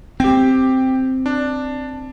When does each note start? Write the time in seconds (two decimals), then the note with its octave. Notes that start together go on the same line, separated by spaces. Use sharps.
0.20 C4 G4 G5
1.26 D4